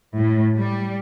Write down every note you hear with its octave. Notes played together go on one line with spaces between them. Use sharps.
A2
G3